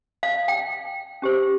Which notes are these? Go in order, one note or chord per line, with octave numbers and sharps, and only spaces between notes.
F5
G5
C#4 G4 C5